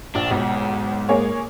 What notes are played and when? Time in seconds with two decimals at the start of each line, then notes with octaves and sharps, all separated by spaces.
0.15 A#1 D4
0.31 B1 G#2
1.09 A#3 G#4 C#5